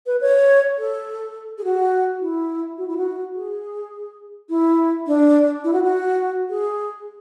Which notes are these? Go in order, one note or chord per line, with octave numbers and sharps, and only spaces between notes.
B4
C#5
A4
G#4
F#4
E4
F#4
E4
F#4
G#4
E4
D4
E4
F#4
F#4
G#4